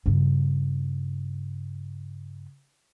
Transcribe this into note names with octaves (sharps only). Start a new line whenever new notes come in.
G2 C#3